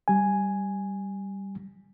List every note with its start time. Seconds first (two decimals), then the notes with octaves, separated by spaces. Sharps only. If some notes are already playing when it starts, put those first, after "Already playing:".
0.08 G3 G#5